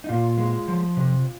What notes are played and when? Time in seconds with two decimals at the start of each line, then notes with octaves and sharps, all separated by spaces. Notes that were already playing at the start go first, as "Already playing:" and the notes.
0.04 D#4
0.09 A#2 F4
0.38 G#3
0.68 F3
0.97 C3